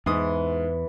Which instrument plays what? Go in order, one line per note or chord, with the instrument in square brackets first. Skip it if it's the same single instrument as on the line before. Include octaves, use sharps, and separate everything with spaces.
[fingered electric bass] E2 [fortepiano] G#2 D#6 [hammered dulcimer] E3